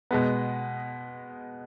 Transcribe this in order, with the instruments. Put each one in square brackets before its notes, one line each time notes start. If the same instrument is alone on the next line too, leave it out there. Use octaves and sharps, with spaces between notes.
[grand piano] B2 G#3 B3